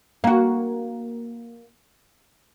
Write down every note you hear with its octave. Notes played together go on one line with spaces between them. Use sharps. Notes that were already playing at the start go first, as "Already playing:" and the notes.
A#3 F#4